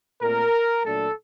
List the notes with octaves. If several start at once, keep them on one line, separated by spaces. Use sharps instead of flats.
A#2 A3 C4 A#4
A#2 F#3 A3 D4 A4